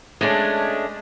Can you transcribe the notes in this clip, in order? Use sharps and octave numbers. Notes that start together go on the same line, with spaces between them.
G#3 A3 C#4 D4 G#4